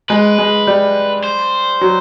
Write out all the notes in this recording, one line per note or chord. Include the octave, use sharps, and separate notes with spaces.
G#3 B4
G#3
G3
C5
F#3